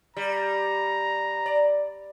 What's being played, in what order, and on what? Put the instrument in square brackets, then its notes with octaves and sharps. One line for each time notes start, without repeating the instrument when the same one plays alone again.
[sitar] G3 [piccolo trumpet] A#5
[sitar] D5